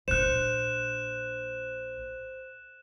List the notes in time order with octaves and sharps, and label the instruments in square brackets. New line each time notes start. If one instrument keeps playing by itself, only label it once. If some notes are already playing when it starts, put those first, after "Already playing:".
[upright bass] A#1 D4 [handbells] C5 [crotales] F#6 E7